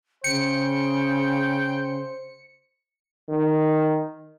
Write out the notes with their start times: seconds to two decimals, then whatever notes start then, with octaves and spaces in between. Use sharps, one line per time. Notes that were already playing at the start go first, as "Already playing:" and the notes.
0.24 C#3 C5 G5 C#7
3.29 D#3